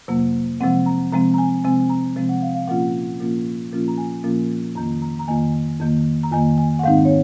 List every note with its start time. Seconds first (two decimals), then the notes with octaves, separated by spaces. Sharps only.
0.08 F2 C3 F#3 A#3
0.60 C3 F3 G#3 C4 F#5
0.86 A#5
1.12 C3 F3 G#3 C4 A#5
1.34 A#5
1.38 G#5
1.64 C3 F3 G#3 C4 G#5
1.90 A#5
2.16 C3 F3 G#3 C4
2.29 F#5
2.42 F5
2.55 F5
2.67 A#2 F3 A#3 C#4 F4 F#5
3.20 A#2 F3 A#3 C#4 F4
3.72 A#2 F3 A#3 C#4 F4
3.88 A#5
3.98 G#5
4.24 A#2 F3 A#3 C#4 F4
4.76 F2 D#3 A#3 A#5
5.02 A#5
5.19 A#5
5.28 F2 D#3 A#3 G#5
5.80 F2 D#3 A#3
6.23 A#5
6.31 F2 D#3 A#3 G#5
6.58 G#5
6.79 F#5
6.84 G#2 D#3 G#3 C4 D#4 F5
7.05 C#5